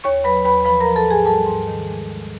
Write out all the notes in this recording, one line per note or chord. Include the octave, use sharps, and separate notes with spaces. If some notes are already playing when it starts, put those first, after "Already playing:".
D#2 C#5 C#6
F#3 B4 B5
D#2 B4 B5
F3 B4 B5
F3 A#4 A#5
A4 A5
G#2 G#4 G#5
G3 A4 A5
G#2
D#3
G#3
G#3